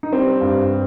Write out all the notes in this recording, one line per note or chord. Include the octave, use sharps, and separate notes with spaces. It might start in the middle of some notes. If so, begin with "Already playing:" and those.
D#4
G3 C4
G2
G3